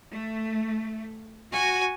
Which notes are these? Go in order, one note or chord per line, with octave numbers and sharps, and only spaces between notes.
A3
F#4 G#5